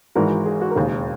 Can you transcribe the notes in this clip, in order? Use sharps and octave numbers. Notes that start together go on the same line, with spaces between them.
G#1 G#2 E3 G#3 F#4 A#4
G#4
F#4
A#4
E1 D#2 C#3 G#4